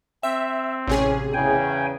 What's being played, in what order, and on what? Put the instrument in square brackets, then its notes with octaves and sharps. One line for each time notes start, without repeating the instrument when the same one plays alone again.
[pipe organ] C4 [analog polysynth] E5
[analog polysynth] A1 C3 G#4 [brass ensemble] C#4
[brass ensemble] E2 C#3 [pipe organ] G5 G#5